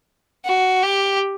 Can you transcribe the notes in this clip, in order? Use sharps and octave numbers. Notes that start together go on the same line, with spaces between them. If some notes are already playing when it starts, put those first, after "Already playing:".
F#4
G4